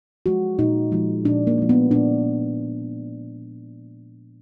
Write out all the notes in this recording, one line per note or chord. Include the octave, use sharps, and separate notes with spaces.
F3 G#3 F#4
A#2 D#4
F3 G#3
A#2 D4
A#3
F3 G#3
B3
A#2 D4